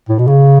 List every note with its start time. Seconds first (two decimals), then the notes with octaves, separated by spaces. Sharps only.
0.09 A2
0.19 B2
0.28 C#3